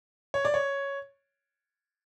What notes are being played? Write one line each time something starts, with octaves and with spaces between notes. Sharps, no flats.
C#5
D5
C#5